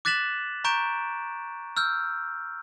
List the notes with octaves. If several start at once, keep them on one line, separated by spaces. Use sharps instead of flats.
D6 F#6 A6 B6 E7 F#7
A#5 C#6 G6 D7 E7
E6 F6 G6